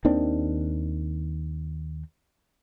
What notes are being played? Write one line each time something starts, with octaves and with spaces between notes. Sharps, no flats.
D#2 D#3 C4 D4